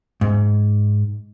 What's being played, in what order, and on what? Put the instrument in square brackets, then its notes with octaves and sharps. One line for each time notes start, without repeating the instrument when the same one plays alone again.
[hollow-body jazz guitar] G#2